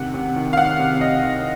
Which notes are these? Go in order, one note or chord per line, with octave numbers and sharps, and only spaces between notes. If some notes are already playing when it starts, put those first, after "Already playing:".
Already playing: C3 D#3 F#5
C3
D#3
F5
D#3 F#5
C3
C3 D#5
D#3